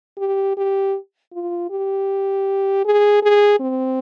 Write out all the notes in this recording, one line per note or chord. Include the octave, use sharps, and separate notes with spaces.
G4
G4
F4
G4
G#4
G#4
C4